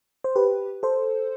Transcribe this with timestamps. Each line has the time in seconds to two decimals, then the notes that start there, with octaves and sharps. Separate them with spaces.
0.24 C5
0.36 G4 B4
0.83 A4 C5